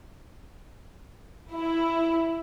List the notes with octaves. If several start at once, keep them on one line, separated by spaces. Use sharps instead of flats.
E4